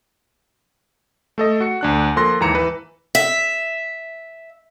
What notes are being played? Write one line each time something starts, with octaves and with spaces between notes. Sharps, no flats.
A3 A4 D#5
F#4 C#7
D2 D4 F#6
F3 A#3 A4 C6 F#6 A#6
D#2 G#2 E3 A#5 C#7 E7
E3 B4
E5